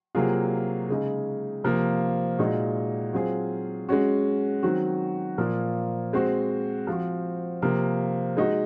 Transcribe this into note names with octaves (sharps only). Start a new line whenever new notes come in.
C3 F#3 A#3 F4 G#4
C#3 G#3 D#4 G#4
C3 F3 A#3
A#2 G#3 D#4 F#4
F#3 C4 F4 G#4
G#3 C#4 F#4
D#3 F#3 C4 F#4
A#2 F3 A#3
G#3 C4 F#4
F3 C4 F#4
C3 F3 A#3
G#3 D#4 F#4